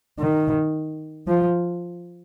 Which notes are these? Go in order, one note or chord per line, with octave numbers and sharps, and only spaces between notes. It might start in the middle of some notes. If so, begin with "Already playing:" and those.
D#3
F3